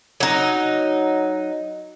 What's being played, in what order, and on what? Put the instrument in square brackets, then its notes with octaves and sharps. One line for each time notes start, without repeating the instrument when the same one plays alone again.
[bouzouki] F#3 D#4